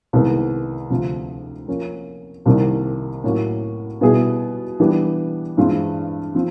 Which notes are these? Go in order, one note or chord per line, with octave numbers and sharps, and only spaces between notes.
C2 C3 D#3 G#3 B3
D2 C3 F3
F3 A#3 C#4
C2 C3 D#3 G3 A#3
A2 F#3 A#3 C#4 F#4
B2 G3 B3 E4 G#4
E3 G3 B3 D4 G4
G2 E3 G#3 C4 F4
F3 C4